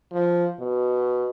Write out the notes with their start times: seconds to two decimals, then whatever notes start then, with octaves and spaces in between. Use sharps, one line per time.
0.12 F3
0.60 B2